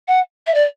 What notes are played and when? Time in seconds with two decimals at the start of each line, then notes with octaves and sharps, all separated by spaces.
0.08 F#5
0.47 E5
0.54 D5